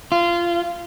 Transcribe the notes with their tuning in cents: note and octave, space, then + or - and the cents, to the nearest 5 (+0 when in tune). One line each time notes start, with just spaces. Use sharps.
F4 -20